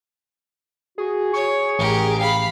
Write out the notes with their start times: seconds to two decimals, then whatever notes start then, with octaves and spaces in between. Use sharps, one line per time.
0.98 F#4 G#4
1.34 C#5 C#6
1.79 A1 G4 A#4
2.20 F5 B5